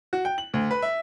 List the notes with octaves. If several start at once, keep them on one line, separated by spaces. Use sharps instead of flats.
F#4
G5
F#7
D2
B4
E5